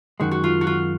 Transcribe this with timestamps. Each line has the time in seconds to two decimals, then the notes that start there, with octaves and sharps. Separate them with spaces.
0.20 F#2 D#3 G#3 F#4
0.31 F#4
0.44 F4
0.61 F#4
0.67 F4